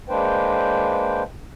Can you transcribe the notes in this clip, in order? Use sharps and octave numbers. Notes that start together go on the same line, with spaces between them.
G#3 A#3 D4 B4 C5 G5